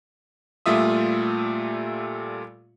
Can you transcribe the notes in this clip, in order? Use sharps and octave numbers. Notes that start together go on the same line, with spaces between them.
A#2 G3 A3 F4 E5 D#6